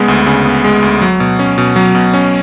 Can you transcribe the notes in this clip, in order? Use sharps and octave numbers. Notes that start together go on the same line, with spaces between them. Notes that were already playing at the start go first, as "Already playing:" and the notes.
Already playing: C#3 G#3 B3
D2
C#3
B3
G#3
D2
F#3
B2
C#4
B2
F#3
B2
C#4